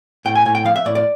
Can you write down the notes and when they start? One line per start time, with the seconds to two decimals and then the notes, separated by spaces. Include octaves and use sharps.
0.25 A2 G5
0.35 G#5
0.45 A2 G#5
0.55 G5
0.65 F3 F5
0.76 E5
0.85 A2 D5
0.95 D5